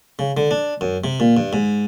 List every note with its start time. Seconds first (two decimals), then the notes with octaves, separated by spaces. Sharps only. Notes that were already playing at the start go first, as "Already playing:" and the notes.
0.19 C#3
0.37 D3
0.51 D4
0.81 F#2
1.04 C3
1.20 A#2
1.37 G2
1.53 G#2